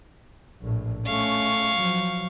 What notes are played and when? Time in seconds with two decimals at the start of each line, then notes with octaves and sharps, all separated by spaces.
0.62 A#1 A2
1.06 A3 C#4 F5 C#6
1.77 F3 F#3